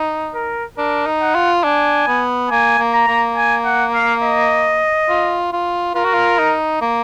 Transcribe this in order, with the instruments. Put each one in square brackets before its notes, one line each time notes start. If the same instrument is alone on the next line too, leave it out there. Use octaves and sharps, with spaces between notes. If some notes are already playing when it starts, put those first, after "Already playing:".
Already playing: [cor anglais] D#4
[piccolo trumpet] A#4
[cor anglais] D4 [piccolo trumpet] A#4
[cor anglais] D#4
[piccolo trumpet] F#5
[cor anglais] F4
[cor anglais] D4 [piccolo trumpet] G#5
[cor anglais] B3
[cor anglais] A#3 [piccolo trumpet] G#5
[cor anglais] A#3
[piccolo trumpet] A#5
[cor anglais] A#3
[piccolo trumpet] G#5
F#5
F5
D#5
[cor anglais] F4
F4
[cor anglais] F4 [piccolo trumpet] A#4
[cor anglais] F#4
F4
D#4
A#3